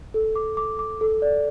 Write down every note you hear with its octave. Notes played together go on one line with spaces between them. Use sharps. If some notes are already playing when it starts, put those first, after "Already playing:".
A4
D6
D6
D6
A4
D5